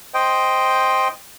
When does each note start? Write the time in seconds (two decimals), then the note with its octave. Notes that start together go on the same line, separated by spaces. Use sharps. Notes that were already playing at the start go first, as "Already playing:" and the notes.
0.14 C5 D#5 G5